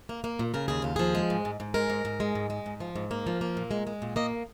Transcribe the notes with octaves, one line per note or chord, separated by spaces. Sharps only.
A#3
A#3
A#2
C#3 A#4
D#2 G#4
D#2 F4
F3 G#4
G#3
G#2
G#2
G#2
G#3 A#4
G#2
G#2
G#3
G#2
G#3
G#2
F3
G#2
A#3
F3
A#3
A#2
G#3
G#3
A#2
A#3 D#5